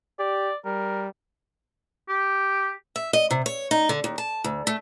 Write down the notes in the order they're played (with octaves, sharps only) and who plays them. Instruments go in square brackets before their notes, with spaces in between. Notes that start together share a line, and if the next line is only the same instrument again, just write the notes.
[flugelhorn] G4 [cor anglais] D5
[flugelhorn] G3 [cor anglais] A#4
[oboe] G4
[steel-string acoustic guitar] E5
D#5
C3
C#5
D#4
D3
D#2
A5
D2
A3